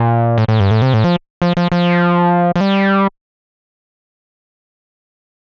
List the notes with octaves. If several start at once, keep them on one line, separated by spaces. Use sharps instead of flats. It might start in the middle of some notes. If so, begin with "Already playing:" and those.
Already playing: A#2
A2
A2
G2
A2
C3
A2
F3
F3
F3
F3
F3
G3